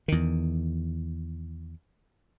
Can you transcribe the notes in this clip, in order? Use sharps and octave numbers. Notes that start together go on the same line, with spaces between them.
E2 D#3